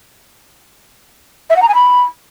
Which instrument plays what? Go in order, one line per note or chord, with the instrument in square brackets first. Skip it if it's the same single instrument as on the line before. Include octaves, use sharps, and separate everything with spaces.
[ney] E5
F#5
A#5
G#5
B5